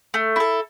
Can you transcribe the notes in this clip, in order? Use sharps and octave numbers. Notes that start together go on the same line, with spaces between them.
A3
E4 A4